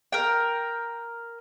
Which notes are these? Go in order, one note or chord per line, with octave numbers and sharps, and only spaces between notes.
A#4 G5